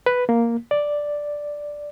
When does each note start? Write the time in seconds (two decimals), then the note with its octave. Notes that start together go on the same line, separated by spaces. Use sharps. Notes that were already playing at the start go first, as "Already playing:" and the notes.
0.06 B4
0.29 A#3
0.71 D5